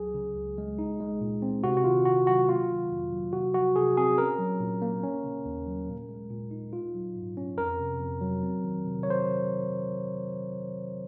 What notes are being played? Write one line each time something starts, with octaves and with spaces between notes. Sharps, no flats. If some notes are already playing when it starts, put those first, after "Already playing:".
Already playing: C#2 F#3 G#4
C#3
C#2
G#3
D#4
G#3
A#2
C4
C3 F#4
F#4
D#3 F4
C3 F#4
F#3 F#4
A#3 F4
D#3
F2
F#3
C3 F#4
F3 F#4
C3 G#4
C4 G#4
C#4 A#4
F#3
A#2
A#3
C#4
C#3
D#2
F#3
A#2
G#3
A#2
D#4
F4
F#3
G#2
C#4
F2 A#4
C3
F2
F#3
C4
D#3
C3
C#5
F#3 C5